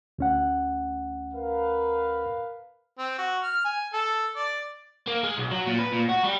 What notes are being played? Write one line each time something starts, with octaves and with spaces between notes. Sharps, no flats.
D2 C#4 F#5
A#4 B4 F5
C4
F#4
F6
G#5
A4
D5
A#3
G#3
B1
F#3
A#2
B4
A#2
F#4
G3